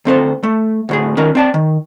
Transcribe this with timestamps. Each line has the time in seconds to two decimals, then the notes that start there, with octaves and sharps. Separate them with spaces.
0.05 D2 C4 A4 C5
0.43 A3
0.89 D2 A2 G#4
1.17 D#3 C#4 A#4
1.35 C4 D5 A5
1.54 D#3